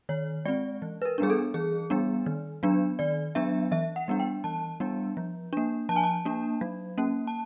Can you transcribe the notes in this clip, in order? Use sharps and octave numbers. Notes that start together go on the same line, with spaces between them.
D#3 C#5
G#3 C4 D5
E3
B4
A#4
G3 B3 D4 G#4
A4
E3 G#4
G3 B3 D4
D#3
F#3 B3 D4
D#3 D5
F#3 B3 D4 E5
E3 E5
F#5
G3 B3 D4
G5
E3 A5
G3 B3 D4
F3
A#3 D4
F3 A5
G#5
A5
A#3 D4
F#3
A#3 C#4
A5